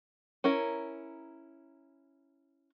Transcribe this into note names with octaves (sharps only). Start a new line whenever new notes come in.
C#4 E4 A#4